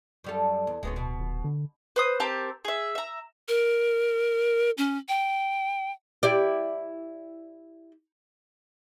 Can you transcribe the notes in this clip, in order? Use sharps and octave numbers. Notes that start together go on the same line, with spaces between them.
F#2 G3 A4
E2
D1 G#3 B3 C#4
B2
D#1
D3
B4 C5 D#6
C4 G4 A#4 A5
G#4 E5
E5 A#5
A#4
C#4
G5
E4 G4 D5